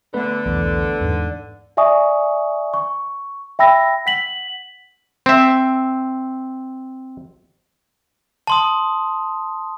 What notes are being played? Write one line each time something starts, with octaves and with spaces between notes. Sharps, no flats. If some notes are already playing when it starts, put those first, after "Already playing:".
D3 A3 B3 B4
B1 E2 E3
E2 G#2
D5 E5 G#5 C#6 D#6
C#6
E5 G5 B5 E6 A#6
F#5 B6 F#7
C4 E5
A5 C6 D#6